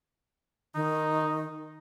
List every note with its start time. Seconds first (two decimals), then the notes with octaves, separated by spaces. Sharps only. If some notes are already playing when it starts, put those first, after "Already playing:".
0.75 D#3 D#4